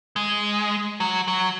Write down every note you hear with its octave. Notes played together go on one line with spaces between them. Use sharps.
G#3
F#3
F#3